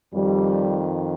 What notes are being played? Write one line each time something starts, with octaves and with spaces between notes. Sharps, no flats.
F2 D#3 G3